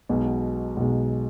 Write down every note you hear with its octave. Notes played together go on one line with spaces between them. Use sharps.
B1 B2 G#3
B1 B2 G#3